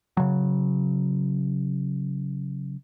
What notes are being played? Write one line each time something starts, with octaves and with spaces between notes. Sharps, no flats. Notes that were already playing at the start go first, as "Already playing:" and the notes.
C#3 F#3